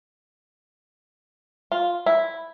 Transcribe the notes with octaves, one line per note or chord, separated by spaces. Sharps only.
F4
E4